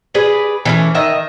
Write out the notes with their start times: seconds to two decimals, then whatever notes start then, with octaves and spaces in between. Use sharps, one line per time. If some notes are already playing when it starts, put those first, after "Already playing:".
0.14 G#4 B4 D5
0.65 E3 A3 C#4
0.95 D#3 D#5 E5